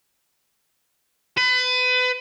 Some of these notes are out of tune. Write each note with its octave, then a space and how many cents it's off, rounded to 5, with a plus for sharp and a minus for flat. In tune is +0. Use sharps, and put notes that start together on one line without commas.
B4 +30